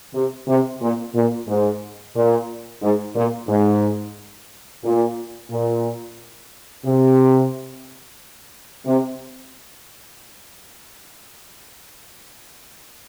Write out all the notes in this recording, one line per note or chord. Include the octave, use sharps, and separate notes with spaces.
C3
C3
A#2
A#2
G#2
A#2
G#2
A#2
G#2
A#2
A#2
C3
C3